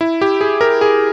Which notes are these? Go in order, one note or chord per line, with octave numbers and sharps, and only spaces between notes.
E4
G4
G#4
A#4
G#4